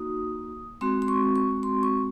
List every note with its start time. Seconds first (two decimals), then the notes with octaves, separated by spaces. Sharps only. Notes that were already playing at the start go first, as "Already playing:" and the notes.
Already playing: A#3 D#4 F#4 D#6
0.81 G#3 C4 F#4 C6
1.02 C6
1.08 C#6
1.36 C#6
1.63 C6
1.83 C#6